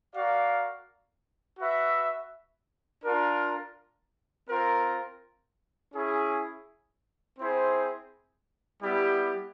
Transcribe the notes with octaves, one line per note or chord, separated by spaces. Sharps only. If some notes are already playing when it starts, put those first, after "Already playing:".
F#4 A#4 D5 F5
F#4 B4 E5
D4 F4 A#4
C4 F4 A#4
C#4 E4 G#4
C4 E4 G#4 C5
G3 B3 E4 G4